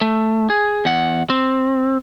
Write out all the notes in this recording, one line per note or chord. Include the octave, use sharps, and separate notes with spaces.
A3
G#4
E2 F#5
C4